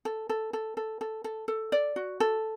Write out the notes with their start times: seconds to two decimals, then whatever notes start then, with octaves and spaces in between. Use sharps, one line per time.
0.05 A4
0.29 A4
0.53 A4
0.77 A4
1.01 A4
1.24 A4
1.48 A4
1.72 D5
1.96 F#4
2.20 A4